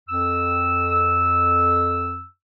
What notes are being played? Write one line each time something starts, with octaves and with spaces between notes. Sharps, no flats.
F2 E6